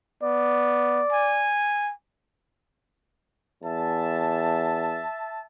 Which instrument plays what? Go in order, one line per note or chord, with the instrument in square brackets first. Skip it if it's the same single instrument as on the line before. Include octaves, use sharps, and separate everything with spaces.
[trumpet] B3 [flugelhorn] D5
[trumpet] G#5
[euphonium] E2 [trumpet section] E5 A5